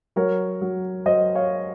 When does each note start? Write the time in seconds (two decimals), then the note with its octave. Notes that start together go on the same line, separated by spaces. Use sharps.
0.16 F#3 A#4 C#5
0.61 F#3
1.06 F#3 C5 D#5
1.35 C#5 F5